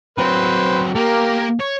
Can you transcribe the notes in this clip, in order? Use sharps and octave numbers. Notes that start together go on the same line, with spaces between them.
F#3 C4 B4 C5
A#3 G4 A#4
C#5